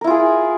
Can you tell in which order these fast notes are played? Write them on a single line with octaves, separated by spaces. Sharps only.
A#4 E4 F4 G#4